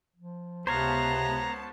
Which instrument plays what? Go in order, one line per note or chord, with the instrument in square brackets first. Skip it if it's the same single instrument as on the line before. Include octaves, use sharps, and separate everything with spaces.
[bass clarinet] F3
[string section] C#2 B3 A5 [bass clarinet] C3 [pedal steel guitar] C5 C#5 F5 [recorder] A#5